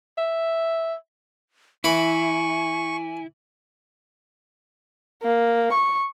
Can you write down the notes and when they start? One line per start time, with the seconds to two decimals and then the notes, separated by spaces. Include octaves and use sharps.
0.18 E5
1.84 E3 E4 B4 G#5 B5 C#6
5.23 A#3
5.73 C#6